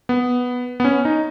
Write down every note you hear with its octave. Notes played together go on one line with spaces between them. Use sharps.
B3
B3
C#4
D#4